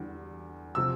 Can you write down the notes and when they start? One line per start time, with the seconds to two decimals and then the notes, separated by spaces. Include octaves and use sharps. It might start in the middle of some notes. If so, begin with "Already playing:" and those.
Already playing: E2 D3 G3
0.75 C3 F3 C4 E6